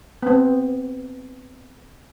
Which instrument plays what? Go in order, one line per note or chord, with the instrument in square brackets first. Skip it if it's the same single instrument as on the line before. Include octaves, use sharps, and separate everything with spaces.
[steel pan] B3 C4